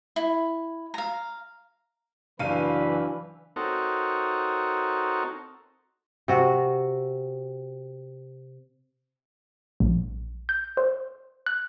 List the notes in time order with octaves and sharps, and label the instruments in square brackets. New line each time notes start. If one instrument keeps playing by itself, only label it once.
[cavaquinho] E4
F5 A#5
[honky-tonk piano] F#1 F5 D#7 [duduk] E3 [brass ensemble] F#3 D4 B4
[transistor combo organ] C4 D#4 F#4 A4 A#4 C#5
[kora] C3 F#4
[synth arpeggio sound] A#1
G6
C5
F#6